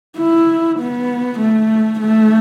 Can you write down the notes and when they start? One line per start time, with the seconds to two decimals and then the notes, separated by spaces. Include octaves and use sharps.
0.18 E4
0.79 B3
1.40 A3
2.00 A3